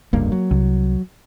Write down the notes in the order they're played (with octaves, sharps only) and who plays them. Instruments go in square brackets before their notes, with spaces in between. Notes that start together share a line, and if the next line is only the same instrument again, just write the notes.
[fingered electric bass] F1 C#2 G2 [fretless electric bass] A#3
[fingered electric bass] F#3
[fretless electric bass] C2